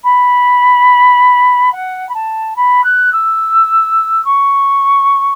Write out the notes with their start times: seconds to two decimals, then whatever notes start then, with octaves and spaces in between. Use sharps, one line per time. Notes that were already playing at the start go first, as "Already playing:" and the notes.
0.03 B5
1.72 F#5
2.09 B5
2.14 A5
2.56 B5
2.84 F#6
3.12 E6
4.25 C#6